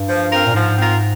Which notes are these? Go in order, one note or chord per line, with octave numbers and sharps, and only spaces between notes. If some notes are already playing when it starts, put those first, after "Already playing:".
Already playing: G2
F3
C4 F4 A#4
A#2
G#2 F3
C4 F4 A#4